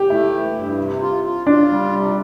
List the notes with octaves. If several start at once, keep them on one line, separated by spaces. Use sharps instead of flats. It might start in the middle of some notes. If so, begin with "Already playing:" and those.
Already playing: G4
A3 E4
E3
G2
C3
F4
F4
D4 F4
G3
C3